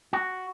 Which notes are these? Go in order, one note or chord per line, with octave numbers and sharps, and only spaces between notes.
F#4